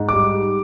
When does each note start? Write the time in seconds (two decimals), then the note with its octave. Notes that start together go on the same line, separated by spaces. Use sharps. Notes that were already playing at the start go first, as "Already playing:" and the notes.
Already playing: G#2
0.09 D6
0.13 G3